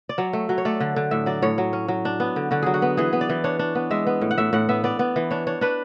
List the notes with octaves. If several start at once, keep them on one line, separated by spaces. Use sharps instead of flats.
D5
F#3 C#5
A3
F#3
C#5
A3 D5
D3
D3
A2 E5
F#3 D5
A2 C#5
F#3
C#4
F#3
D4
B3
D3
D3 F#4
F#3 G#4
F#4
B3
E3 G#4
B3
D5
E3
D4 C#5
D4
B3
G#3 E5
B3
A2
F#5
A2 E5
A2 F#5
B3 E5
B3 D5
B3
E3
D4 C#5
D4 C#5
D4 B4